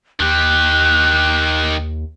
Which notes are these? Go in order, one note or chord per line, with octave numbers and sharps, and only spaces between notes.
D#2 D#3 G4 F#6